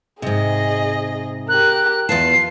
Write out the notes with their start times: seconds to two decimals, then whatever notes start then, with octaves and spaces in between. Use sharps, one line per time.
0.22 G#2 C3 G#4 D#5
1.49 G4 A#4 F#6
2.09 E2 F4 B4 A5 C7